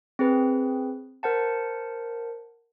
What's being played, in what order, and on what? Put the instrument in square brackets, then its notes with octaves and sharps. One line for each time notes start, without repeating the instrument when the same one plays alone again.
[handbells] C4 G#4 B4
A#4 C5 F#5 A5